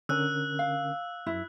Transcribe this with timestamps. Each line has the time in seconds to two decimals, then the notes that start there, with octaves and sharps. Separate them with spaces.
0.09 D3 C#4 A#4 E6 F#6
0.59 F5
1.27 F#2 E4